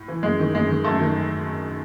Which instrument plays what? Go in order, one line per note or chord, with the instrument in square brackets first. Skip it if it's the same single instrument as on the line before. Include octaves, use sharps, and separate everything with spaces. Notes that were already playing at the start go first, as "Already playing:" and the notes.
Already playing: [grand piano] A2
E3
F#2 G#3
D#3
F#2 G#3
D#3
F#2 A3
D#3